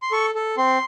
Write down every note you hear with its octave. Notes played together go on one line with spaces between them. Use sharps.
C6
A4 C#6
A4
C4 C6